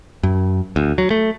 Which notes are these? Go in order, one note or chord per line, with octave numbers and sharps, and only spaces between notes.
F#2
D2
F#3
A3